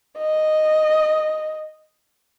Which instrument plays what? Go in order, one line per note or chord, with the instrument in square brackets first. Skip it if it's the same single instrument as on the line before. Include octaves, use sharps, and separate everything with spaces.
[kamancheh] D#5